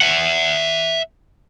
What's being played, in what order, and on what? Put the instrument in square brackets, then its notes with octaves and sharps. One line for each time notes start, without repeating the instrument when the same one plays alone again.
[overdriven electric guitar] E5 F#5